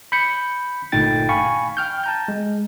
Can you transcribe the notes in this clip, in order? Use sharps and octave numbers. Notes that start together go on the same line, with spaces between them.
B5 G6 C#7
G1 A#2 A3 D#4 G5 A6
F5 G#5 B5 C#6
G5 F6 G6
A5 A#5 G6
G#3